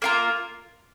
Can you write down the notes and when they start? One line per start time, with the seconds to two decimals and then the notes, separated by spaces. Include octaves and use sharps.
0.02 A#3 F4 A#4